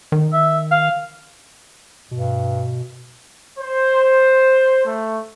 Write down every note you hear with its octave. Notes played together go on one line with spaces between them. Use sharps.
D#3
E5
F5
G2 B2
C5
A3